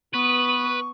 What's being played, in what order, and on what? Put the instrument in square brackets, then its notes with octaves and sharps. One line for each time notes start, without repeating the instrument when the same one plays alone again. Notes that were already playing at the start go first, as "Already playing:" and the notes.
[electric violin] B3 D#6 [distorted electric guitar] B4 [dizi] C#6